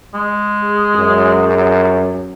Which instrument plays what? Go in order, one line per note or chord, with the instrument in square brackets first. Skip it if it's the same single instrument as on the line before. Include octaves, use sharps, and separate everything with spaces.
[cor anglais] G#3
[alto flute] G#4
[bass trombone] F#2